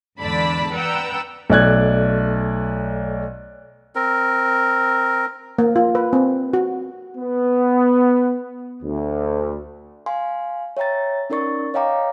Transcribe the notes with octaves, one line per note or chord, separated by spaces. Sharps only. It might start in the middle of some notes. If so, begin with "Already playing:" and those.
E2 G#2 D3 D5 A5 B5
B4 D5 F#5 G5 A#5 E6
B1 A3 D5 F#6 G#6
C4 A#4
A#3
F4
B4
C4
F#4
B3
D2
F5 G#5 C6
C#5 E5 G5 A#5 A6
C#4 D#4 A#4 D5 C#6 A6
C#5 D#5 F5 G5 A#5 D6